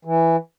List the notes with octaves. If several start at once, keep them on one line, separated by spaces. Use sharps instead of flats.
E3